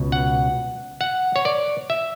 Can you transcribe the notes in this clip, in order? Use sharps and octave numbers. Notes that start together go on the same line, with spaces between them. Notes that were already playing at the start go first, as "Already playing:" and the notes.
Already playing: C#2 B2
F#5
F#5
C#5
D5
E5